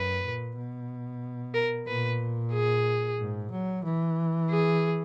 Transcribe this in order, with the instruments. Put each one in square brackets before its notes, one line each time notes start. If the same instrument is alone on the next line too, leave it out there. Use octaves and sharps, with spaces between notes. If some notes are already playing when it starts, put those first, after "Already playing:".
Already playing: [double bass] F#2 [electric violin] B4
[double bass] A#2
B2
[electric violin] A#4
[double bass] A#2 [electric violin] B4
[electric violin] G#4
[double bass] G#2
F#3
E3
[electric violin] G#4